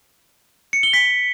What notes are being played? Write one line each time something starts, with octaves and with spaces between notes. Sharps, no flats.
C#7
G7
B6